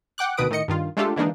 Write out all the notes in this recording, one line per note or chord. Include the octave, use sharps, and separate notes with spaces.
F#5 G5 D6 F#6
D2 B2 D#3 B4 D#6 D7
A2 D#3 D#5 C#7
G2 D#3 F4
G#3 A3 D4 F4 G4 A4
D3 E3 G#3 A#3 D4 D#4